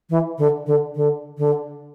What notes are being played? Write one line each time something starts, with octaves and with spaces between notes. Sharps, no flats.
E3
D3
D3
D3
D3